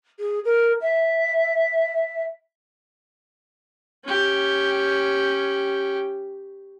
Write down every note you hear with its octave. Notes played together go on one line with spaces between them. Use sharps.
G#4
A#4
E5
C#4 G4